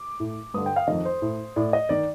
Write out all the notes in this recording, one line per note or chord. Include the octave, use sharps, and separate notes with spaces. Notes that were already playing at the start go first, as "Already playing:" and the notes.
Already playing: D6
A2
G2 D3 D#6
G5
F5
F2 D#3 D#5
C5
A2
A2 D5
D#5
D#3 D5